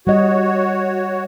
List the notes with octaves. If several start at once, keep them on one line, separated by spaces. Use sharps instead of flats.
G3 F#4 C#5 D#5